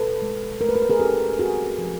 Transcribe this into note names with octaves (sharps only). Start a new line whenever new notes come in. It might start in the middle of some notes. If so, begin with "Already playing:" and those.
Already playing: B2 A4 B4
G#3
A3 A#4
B4
A#4
B4
G#4 A#4
C#4 G4 A4
C4 F#4 G#4
F3